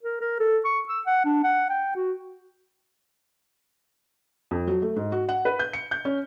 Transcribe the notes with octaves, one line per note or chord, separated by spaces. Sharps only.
A#4
A#4
A4
C#6
E6
F#5
D4
F#5
G5
F#4
F2
F#3
A3
G#2
F#4
F#5
B4
G6
C#7
G6
C#4